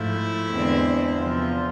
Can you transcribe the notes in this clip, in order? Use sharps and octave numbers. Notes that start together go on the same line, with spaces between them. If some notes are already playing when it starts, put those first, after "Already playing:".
Already playing: G#2 F3 A3 E4
E2 D3 G#3 C4
E2 C3 F3 F4